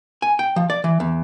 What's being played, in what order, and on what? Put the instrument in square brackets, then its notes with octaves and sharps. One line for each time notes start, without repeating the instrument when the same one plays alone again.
[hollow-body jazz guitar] G#5
G5
F3
D5
E3
E2